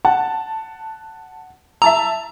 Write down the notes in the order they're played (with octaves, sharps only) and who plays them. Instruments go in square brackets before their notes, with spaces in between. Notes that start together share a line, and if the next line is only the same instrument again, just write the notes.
[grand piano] F#5 [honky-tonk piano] A5
[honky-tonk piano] E5 A5 E6 [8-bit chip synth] A#5